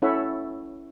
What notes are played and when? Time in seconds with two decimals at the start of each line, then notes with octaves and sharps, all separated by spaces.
0.02 C#4 E4 A4 C#5 E5 F#5